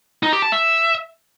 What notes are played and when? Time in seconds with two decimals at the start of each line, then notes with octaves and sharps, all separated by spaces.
0.23 D#4
0.33 G4
0.42 A5
0.52 E5